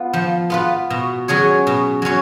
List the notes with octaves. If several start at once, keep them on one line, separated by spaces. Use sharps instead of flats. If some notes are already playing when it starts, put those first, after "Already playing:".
Already playing: B3 F4 B4
F3
B3 F4 B4
B2
F#3 C#4 G#4 C#5
B2
F#3 C#4 C#5